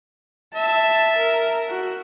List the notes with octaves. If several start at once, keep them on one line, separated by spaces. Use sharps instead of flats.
E5 A5
A#4
F#4